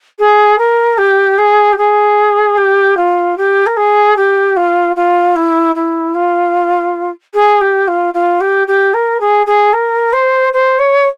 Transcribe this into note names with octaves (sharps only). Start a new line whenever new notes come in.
G#4
A#4
G4
G#4
G4
G#4
G4
F4
G4
A#4
G#4
G4
F4
F4
E4
E4
F4
G#4
G4
F4
F4
G4
G4
A#4
G#4
G#4
A#4
C5
C5
C#5